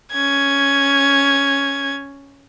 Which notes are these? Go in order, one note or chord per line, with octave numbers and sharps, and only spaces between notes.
C#4 G#6